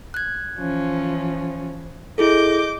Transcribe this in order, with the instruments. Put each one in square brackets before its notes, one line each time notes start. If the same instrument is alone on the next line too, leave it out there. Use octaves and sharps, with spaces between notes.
[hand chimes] F#6 G#6
[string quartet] E3 F3 C#4
[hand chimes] E4 G#4 A4 [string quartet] D#5 D6 G6